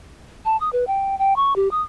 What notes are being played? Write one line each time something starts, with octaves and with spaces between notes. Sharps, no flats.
A5
D#6
B4
G5
G5
C#6
G4
D#6